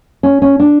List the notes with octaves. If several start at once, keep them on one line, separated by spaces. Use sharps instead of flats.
C#4
C#4
D4